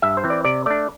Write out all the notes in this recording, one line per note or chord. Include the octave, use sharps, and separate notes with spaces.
G2 E5
C5
E3 C4
D5
C3 D5
A3 D4 D5